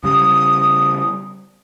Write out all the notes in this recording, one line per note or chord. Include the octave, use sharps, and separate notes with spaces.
C#3 G3 D#6